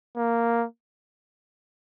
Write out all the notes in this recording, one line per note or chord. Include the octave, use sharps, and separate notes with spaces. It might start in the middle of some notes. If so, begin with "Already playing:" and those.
A#3